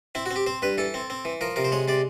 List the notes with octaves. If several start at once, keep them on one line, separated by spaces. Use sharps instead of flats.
C4 E4
F#4
C4
G4
C4 C5
G2 B4
E3 A4
C4
C4
E3
F3 A#4
C3 A#4
C5
G#3 C#5
C3 D5